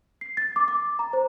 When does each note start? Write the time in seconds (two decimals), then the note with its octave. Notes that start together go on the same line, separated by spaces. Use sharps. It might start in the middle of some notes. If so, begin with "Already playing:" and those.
0.21 C7
0.37 A6
0.56 D6
0.68 D6
0.99 A#5
1.13 C5